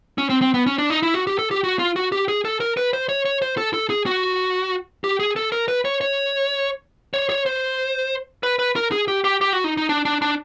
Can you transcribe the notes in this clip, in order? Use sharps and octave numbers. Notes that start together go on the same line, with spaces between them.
C#4
C4
C4
B3
C#4
D4
D#4
E4
F#4
G4
A4
G4
F#4
F4
F#4
G4
G#4
A4
A#4
B4
C5
C#5
C#5
C5
A4
A4
G#4
F#4
G4
G#4
A4
A#4
B4
C#5
C#5
C#5
C#5
C5
B4
B4
A#4
G#4
G4
G4
G4
F#4
D#4
D#4
D4
D4
D4